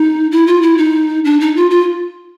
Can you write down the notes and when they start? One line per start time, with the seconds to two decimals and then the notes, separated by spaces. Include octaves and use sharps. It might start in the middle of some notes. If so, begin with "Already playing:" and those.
Already playing: D#4
0.32 E4
0.47 F4
0.62 E4
0.78 D#4
1.25 D4
1.41 D#4
1.56 F4
1.71 F4